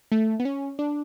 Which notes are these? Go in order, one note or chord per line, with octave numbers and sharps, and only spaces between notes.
A3
B3
C#4
D4